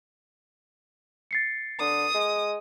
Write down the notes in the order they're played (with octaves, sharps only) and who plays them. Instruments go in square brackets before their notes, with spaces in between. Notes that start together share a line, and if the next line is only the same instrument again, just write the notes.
[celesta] A6 C7 C#7
[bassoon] D3 [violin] D#6
[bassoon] G#3